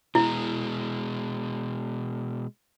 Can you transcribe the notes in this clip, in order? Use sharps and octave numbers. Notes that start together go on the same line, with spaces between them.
B2 G#3 E4